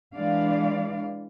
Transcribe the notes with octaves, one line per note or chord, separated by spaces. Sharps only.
E3 G#3 D4 D5 F5